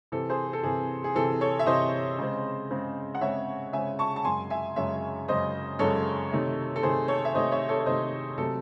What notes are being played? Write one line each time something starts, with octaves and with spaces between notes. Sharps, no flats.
C3 E3 C4 A4
G#4 C5
A4
C3 E3 C4 G#4
G#4
C3 E3 C4 A4
A4 C#5
E5
C3 E3 C4 C5 D#5
C#3 G#3 C4
C#3 G#3 C4
F#5
C#3 G#3 C4 C#5 E5
C#3 G#3 C4 E5 G#5
A5 C#6
A5
F#2 C#3 G#3 G#5 C6
E5 G#5
F#2 C#3 G#3 C#5 E5
F#2 C#3 G#3 C5 D#5
F#2 C#3 G#3 A4 C#5
C3 D#3 A3
A4
C3 D#3 A3 G#4 C5
A4 C#5
E5
C3 D#3 A3 C5 D#5
C#5 E5
A4 C#5
C#5
C3 D#3 A3 C5 D#5
C3 F#3 A3 C4 A4